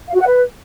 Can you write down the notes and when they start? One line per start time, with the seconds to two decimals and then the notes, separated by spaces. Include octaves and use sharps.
0.08 F5
0.15 F#4
0.21 F#5
0.27 B4